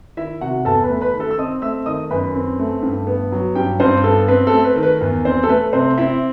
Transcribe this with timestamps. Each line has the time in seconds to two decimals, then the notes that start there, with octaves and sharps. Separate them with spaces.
0.17 D#3 E4 E5
0.41 C3 F#4 F#5
0.65 E2 A4 A5
0.84 B4 B5
0.89 A3
1.01 B4 B5
1.14 D#3
1.20 A4 A5
1.31 E6
1.38 C4 D#5 D#6
1.62 A3 E5 E6
1.86 D#3 D#5 D#6
2.10 F#2 B4 B5
2.34 C4
2.59 A3
2.83 G2
3.07 B3
3.32 F#3
3.55 G2 G4 G5
3.80 G2 C4 C5
4.04 B3 A4
4.28 C4 B4
4.47 A4
4.53 A3
4.64 B4
4.76 D#3
4.83 B4
5.01 E2
5.25 C4 C5
5.44 A4
5.48 A3 B4
5.73 C3 C4 C5
5.98 C4 E4 E5